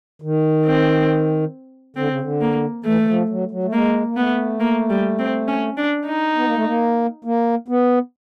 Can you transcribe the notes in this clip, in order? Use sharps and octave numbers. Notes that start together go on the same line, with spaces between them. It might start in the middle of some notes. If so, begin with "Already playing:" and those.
D#3
C4
D3 C4
C#3
D3
A#3
E3 A3
E3
F3
F#3
F#3
A3
G#3 A#3
A#3
A3 B3
A#3
G3
C4
C#4
D4
D#4
B3
A#3
A3
A#3
A#3
B3